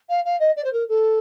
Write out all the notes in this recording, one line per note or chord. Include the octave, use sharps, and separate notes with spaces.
F5
F5
D#5
D5
C5
A#4
A4